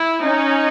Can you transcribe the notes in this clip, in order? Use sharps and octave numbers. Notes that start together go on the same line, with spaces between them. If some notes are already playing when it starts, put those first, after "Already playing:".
Already playing: E4
C#4 D#4